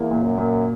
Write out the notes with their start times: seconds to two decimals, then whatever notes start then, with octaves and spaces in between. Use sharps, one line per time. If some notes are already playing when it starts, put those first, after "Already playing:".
Already playing: E2 A#3
0.11 A#2
0.24 F#2
0.38 A#2